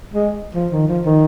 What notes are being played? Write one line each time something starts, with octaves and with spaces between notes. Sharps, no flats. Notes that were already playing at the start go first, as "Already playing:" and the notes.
G#3
F3
D#3
F3
D#3